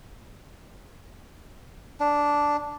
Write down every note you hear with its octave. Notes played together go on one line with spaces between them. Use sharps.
D4